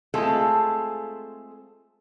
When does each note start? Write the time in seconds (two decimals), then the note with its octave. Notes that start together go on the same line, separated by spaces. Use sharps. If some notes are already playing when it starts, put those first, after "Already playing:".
0.14 G#3 A3 C4 F4 G#4 A4